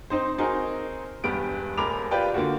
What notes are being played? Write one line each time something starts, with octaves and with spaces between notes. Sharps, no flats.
C4 D#4 C5
C4 D#4 F#4 G#4 A#4
E1 G2 B3 G4 D7
D#1 G#3 A#4 B5 D6 F7
F4 G4 B4 D5 G5
D3 A#3 F4 F#4